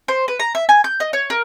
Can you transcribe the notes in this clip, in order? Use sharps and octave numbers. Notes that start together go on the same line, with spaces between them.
C5
B4
A#5
E5
G#5
G6
D#5
C#5
A#4